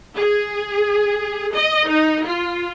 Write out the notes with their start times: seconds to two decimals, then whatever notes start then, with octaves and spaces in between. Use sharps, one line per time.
0.17 G#4
1.54 D#5
1.88 D#4
2.25 F4